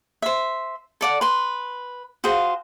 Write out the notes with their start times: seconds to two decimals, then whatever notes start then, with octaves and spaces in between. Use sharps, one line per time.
0.22 C5 E5
1.01 A4 D5 F#5
1.21 B4 C6
2.24 F#4 G#4 C5 F5